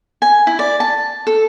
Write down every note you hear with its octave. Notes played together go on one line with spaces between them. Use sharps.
G#5
E4
D5
A5
A4